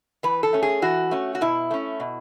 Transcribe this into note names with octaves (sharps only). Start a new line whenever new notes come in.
E3 B4
A4
A3 C#4
G#4
E3 F#4
A3 C#4
F#4
B2 E4
A3 C#4
B2